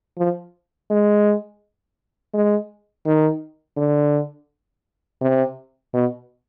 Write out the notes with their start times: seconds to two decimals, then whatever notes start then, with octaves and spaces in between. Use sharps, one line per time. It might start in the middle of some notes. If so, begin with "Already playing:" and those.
0.18 F3
0.91 G#3
2.34 G#3
3.06 D#3
3.77 D3
5.21 C3
5.94 B2